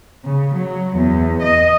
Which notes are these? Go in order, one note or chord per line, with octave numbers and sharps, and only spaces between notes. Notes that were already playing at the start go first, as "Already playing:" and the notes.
C#3
F#3
E2
D#5